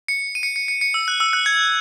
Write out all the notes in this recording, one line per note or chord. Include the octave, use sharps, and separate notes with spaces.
C#7
D#7
C#7
C#7
C#7
C#7
E6
F#6
E6
F#6
G#6